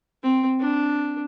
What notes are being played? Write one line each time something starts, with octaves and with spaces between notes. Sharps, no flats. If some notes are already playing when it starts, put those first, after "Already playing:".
C4
D4